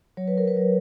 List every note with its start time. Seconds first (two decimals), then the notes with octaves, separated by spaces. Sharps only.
0.17 F#3 C#5
0.28 B4
0.38 A#4
0.48 B4
0.57 F#3